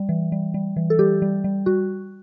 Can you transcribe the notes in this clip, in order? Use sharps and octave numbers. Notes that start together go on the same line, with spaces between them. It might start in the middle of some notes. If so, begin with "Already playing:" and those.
Already playing: G3
E3
G3
G3
E3
A4
G3 G4
G3
G3
G3 F#4